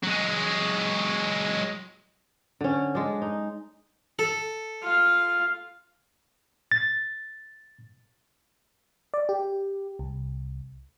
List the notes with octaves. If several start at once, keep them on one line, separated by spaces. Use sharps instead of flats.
F#3 G#3
D3 C#4
G#3 D4
D#4
A4
F4 F5
A6
D5
G4
C2